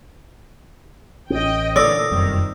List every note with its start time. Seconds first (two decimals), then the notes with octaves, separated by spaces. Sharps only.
1.30 A1 C#4 D#5 G5
1.76 A#2 D3 E3 D5 D#6 E6 A#6
2.11 F1 F#2 D#3 G3 C4